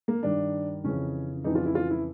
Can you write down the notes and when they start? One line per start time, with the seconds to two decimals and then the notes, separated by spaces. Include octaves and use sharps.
0.08 A#3
0.23 G2 D#3 D4
0.84 F2 C#3 E3 C#4
1.44 F2 C#3 E3 D#4
1.55 F4
1.66 E4
1.75 F4
1.90 E4